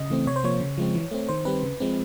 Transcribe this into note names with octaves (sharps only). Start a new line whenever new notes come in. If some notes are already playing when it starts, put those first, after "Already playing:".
Already playing: C#3 D#5
E3 A3 C4
C3 C#5
C5
F3 A#3 C#5
C#3
F3 G#3 C4
E3
A3 C4
D#3 C5
G3 C4 B4
C#3
F3 G#3 C4